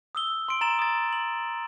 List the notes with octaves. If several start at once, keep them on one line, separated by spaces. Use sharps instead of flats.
D#6 E6 G7
C6 D7
A#5 A6 E7 F#7
D#6 A6
F#7